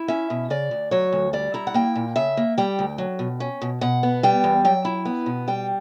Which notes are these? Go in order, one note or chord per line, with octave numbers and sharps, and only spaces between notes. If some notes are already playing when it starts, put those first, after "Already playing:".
Already playing: E4
C#4 E5
B2
C#3 D5
D2
F#3 C#5
D2
G3 D5
E4 A#5
F#5
A#3 G5
A#2
C#3 E5
A#3
G3 G5
D2
F#3
B2
C#4
B2
B2 F#5
B3
G3 G5
E2
F#3 G5
E4
B3
B2
G3 G5